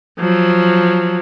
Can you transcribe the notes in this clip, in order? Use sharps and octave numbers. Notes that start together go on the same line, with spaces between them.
F3 F#3